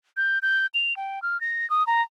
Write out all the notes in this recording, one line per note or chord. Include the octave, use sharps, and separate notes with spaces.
G6
G6
F7
G5
F6
A#6
D#6
A#5